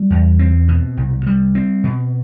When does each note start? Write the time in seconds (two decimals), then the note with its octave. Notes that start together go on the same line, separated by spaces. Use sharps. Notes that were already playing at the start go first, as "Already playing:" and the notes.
Already playing: G3
0.10 E2
0.39 C4
0.68 B2
0.97 C2
1.26 G3
1.55 C4
1.84 B2